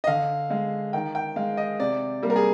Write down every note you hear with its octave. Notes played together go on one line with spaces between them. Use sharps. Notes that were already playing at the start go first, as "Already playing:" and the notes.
D#5
D3 F5
G#3 F5
D#3 G5
G5
G#3 F5
D#5
C3 D5
G3 A#3
A#4
G#4